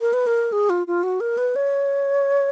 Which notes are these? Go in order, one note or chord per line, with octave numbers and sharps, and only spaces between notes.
A#4
B4
A#4
G#4
F4
F4
F#4
A#4
B4
C#5